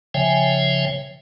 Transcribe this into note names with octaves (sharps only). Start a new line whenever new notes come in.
C#3 F3 C#5 E5 G5 G#5